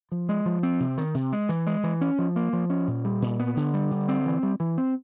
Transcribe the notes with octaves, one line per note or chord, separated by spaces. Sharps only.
F3
G#3
F3
C4
C3
D#3
C3
G#3
E3
G#3
E3
C#4
F3
A#3
F3
C#4
A#2
G3
A#2
B3
D3
G3
D3
C4
E3
G3
E3
C4